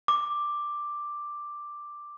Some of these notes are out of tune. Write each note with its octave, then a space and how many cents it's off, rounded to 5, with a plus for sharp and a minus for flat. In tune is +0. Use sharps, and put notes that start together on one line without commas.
D6 +5